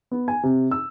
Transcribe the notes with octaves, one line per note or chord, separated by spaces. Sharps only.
B3
G#5
C3
E6